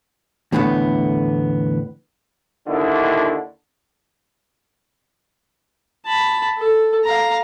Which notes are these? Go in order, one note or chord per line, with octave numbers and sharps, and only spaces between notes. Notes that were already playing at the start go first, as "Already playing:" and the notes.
E2 A2 D3 A3 B3
D#2 D3 D#3 D4 E4
A5 B5
A4
F5 A#5